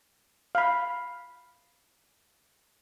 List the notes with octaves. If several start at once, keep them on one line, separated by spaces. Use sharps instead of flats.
F5 B5